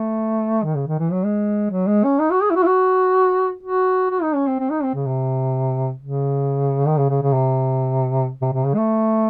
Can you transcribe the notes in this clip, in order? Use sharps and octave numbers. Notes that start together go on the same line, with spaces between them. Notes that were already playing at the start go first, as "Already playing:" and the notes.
Already playing: A3
D#3
C#3
D#3
E3
F#3
G#3
F#3
G#3
C#4
D#4
F#4
G#4
E4
F#4
E4
F#4
F#4
F#4
D#4
C#4
C4
C4
D#4
C4
C#3
C3
C#3
D#3
C#3
C#3
C#3
C3
C3
C3
C#3
G#3
A3